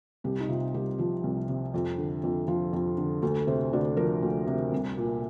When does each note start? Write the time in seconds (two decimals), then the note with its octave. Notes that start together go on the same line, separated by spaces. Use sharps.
0.24 C2 G4
0.40 D#4
0.48 C3 F4
0.74 C2 G4
0.98 F3 F4
1.24 C2
1.49 C3
1.74 F2
1.98 D3
2.24 F2
2.48 F3 F4
2.73 F2
2.98 D3
3.22 D2 A4
3.47 C3 C5
3.73 D2 D5
3.97 F3 A#4
4.23 D2
4.47 C3
4.72 C2
4.98 A#2